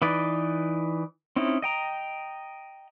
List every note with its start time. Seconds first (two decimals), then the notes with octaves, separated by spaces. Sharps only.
0.02 E3 D#4 B4 D5
1.36 C4 C#4 D#4 E4
1.62 D#5 G5 A#5